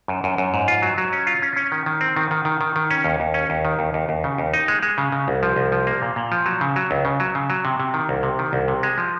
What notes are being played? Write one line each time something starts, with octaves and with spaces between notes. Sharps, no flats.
F#2
F#2
F#2
G#2
F4
F#3
F#3
C#4
F4
C#4
C#4
D#3
D#3
C4
D#3
D#3
D#3
D#3
D#3
C#4
D#2
D#2
C#4
D#2
D#3
D#2
D#2
D#2
C#3
D#2
D#4
G#3
G#3
C#3
C#3
C2
F3
C2
F3
A#3
A#2
A#2
F3
F#3
C#3
F#3
C#2
C#3
F#3
C#3
F#3
C3
C3
D#3
C2
C3
D#3
C2
C3
G#3
F3